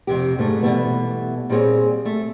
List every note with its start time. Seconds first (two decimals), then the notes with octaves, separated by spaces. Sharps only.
0.07 F2 C3 G4
0.38 G#2 G3 A3
0.62 B2 D#3 E3 G3 A3 B3
1.49 A#2 G3 C4 G#4 C#5
2.05 A3